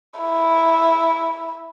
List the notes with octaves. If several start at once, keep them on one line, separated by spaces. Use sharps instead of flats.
E4